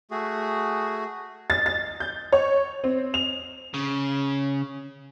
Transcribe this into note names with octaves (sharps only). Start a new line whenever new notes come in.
A3 F#4 G#4
A6
A6
G6
C#5
C4
F7
C#3